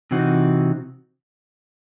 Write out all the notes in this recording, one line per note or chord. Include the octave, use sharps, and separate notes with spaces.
C3 E3 C4 D#4 F#4